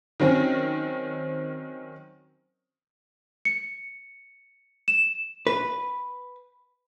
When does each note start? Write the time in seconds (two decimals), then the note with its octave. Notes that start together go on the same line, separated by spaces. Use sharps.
0.20 D#3 F#3 C4 C#4
3.45 C#7
4.88 E7
5.47 B4